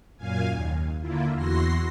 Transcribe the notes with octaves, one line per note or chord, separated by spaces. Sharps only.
F#2 A#2 F5 G#5
D#2
D3 A#3 E4 F4
E2 E3 F#4 C6 A#6 C7